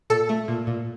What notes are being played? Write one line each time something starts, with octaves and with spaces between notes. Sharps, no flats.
A#2 A4
A3
A#2
A#2